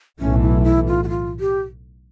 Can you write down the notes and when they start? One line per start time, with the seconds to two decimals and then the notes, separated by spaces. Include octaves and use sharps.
0.20 B1 A2 E3 A3 C#4
0.43 E4
0.64 E4
0.88 F4
1.04 F#4
1.09 F4
1.40 G4